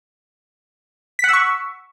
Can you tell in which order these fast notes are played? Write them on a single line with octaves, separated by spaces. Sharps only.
B6 F#5 E6 C#6